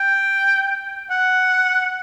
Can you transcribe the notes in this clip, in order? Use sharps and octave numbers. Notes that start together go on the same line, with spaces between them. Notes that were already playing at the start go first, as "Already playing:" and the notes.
Already playing: G5
F#5